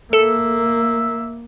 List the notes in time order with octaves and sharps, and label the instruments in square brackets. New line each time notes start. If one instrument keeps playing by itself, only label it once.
[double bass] A#3 [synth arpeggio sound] A4 [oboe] E5